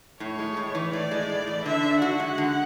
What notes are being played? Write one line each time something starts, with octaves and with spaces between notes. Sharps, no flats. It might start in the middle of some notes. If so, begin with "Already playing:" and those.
A2 C#5
G#3
A2
E3
A2 D5
G#3
A2
E3
D3 E5
D4
F#4 F#5
G#3
D3